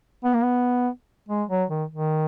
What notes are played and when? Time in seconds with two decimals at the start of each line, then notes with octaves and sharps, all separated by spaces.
0.24 B3
0.34 A#3
0.43 B3
1.29 G#3
1.49 F#3
1.70 D#3
1.90 D#3